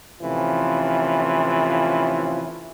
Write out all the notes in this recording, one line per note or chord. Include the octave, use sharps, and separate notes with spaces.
A2 C3 E3 F3 C#4 F4